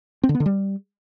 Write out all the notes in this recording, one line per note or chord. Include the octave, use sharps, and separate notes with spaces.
C4
D3
B3
D3
G3